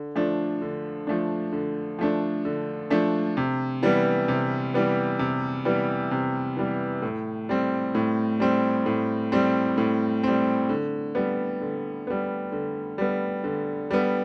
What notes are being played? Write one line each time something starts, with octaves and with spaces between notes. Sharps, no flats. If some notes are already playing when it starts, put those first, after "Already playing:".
Already playing: D3
F3 A3 D4
D3
F3 A3 D4
D3
F3 A3 D4
D3
F3 A3 D4
C3
E3 G3 B3
C3
E3 G3 B3
C3
E3 G3 B3
C3
E3 G3 B3
A2
G3 C4
A2
G3 C4
A2
G3 C4
A2
G3 C4
D3
G3 B3
D3
G3 B3
D3
G3 B3
D3
G3 B3